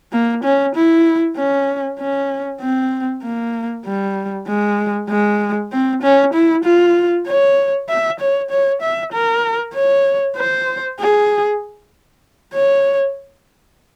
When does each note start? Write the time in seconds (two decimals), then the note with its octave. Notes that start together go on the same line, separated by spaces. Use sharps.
0.12 A#3
0.44 C#4
0.76 E4
1.36 C#4
1.99 C#4
2.61 C4
3.23 A#3
3.86 G3
4.47 G#3
5.09 G#3
5.72 C4
6.03 C#4
6.34 E4
6.64 F4
7.27 C#5
7.89 E5
8.20 C#5
8.50 C#5
8.82 E5
9.13 A#4
9.74 C#5
10.37 C5
11.00 G#4
12.54 C#5